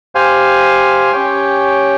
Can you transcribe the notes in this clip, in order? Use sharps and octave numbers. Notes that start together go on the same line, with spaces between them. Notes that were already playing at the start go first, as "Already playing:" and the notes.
G4 C5 F5 G#5
C#4 G4 C#5 G5